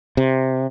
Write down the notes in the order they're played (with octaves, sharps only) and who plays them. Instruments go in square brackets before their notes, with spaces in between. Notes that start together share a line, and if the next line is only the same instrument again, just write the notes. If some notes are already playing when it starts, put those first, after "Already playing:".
[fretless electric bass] C3